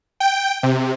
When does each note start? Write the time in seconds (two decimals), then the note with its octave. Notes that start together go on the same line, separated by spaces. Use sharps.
0.20 G5
0.63 C3